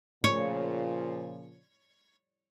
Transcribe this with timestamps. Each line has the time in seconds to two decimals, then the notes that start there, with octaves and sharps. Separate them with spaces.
0.24 A#2 C#3 F3 C#5